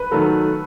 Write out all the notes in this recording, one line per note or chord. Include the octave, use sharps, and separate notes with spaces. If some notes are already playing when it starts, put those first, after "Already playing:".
Already playing: B4
D#3 F#3 A3 A4